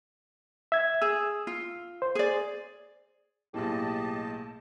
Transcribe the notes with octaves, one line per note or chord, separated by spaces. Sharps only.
E5 G#6
G#4 E6
F4
C5
G#4 D5
B1 A2 A#3 B3 G4 G#4 D#5 A5